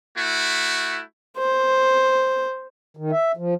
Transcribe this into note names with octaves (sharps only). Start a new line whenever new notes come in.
A3 E4 F#4
C5
D#3
E5
F3